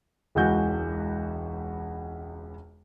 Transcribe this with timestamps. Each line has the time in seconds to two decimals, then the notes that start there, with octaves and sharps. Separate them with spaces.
0.35 E1 C#2 E3 F#4 G6